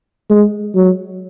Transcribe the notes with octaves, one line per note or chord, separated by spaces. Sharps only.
G#3
F#3